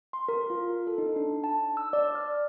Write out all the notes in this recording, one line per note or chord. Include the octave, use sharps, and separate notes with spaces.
C6
A#4
F4
A4
D#4
D4
A5
E6
D5
F6